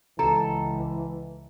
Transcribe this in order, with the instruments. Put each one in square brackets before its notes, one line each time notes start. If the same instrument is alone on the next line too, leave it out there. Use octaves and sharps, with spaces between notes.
[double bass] C#2 [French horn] E3 [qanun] A4 [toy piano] A#5